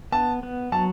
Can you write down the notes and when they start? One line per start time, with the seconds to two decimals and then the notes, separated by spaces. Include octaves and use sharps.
0.12 B3 A5
0.43 B3
0.72 F#3 A5